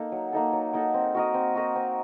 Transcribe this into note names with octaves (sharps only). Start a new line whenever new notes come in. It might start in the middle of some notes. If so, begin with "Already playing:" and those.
Already playing: A#3 D#4 A4
F#3
A#3 D#4 A4
F#3
A#3 D#4 A4
C4
F#4 A#4 D#5
C4
F#4 A#4 D#5
C4